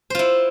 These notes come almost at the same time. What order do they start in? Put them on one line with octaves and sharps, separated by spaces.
C5 F4 E4